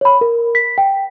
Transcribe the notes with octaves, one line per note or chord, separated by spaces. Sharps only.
C#5 B5
A#4
B6
G5